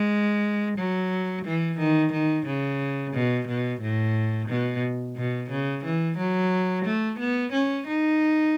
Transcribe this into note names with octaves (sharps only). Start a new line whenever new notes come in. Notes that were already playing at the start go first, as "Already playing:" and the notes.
Already playing: G#3
F#3
E3
D#3
D#3
C#3
B2
B2
A2
B2
B2
C#3
E3
F#3
A3
B3
C#4
D#4